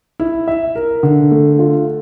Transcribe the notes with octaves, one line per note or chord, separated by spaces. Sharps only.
E4
E5
A#4
D3
A3
F4